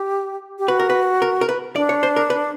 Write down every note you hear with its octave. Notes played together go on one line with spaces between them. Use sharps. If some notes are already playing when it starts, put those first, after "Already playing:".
Already playing: G4
G4
F#4 B4
A#4
B4
A#4
A#4
B4
D4 D5
C#5
C5
A#4
B4